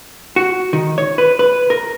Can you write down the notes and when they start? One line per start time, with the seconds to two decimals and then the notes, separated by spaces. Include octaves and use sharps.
0.36 F#4
0.73 D#3
0.98 C#5
1.18 B4
1.39 B4
1.70 A#4